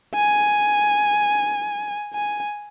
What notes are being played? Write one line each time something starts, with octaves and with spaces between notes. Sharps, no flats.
G#5
G#5